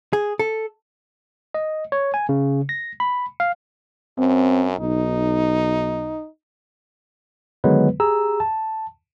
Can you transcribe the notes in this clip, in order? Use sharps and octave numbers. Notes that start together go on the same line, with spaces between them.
G#4
A4
D#5
C#5
G#5
C#3
A#6
B5
F5
F#2 C4
B1 D#4
D3 D#3 F#3 G#3 B3 B4
G4 G#4 A#5 E6
A5